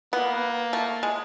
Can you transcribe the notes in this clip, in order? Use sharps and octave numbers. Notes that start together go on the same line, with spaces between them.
A#3 B3
A3
G#3